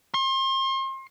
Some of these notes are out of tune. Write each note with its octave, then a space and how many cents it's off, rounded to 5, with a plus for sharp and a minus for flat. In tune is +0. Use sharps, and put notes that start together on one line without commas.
C6 +35